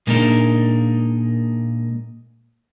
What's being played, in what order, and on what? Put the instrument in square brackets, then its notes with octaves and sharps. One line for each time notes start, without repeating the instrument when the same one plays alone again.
[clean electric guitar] A#2 G#3 A#3 D4 D#4 A#4